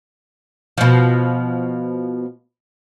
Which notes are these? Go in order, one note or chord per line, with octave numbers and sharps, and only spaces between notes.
B2 F3